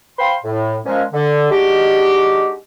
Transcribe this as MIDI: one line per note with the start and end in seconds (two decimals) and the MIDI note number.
0.19 0.35 72
0.19 0.35 77
0.19 0.35 79
0.19 0.35 83
0.19 0.35 84
0.44 0.77 45
0.86 1.03 46
0.86 1.03 53
0.86 1.03 56
0.86 1.03 61
1.13 1.46 50
1.50 2.53 56
1.50 2.53 62
1.50 2.53 63
1.50 2.53 66
1.50 2.53 67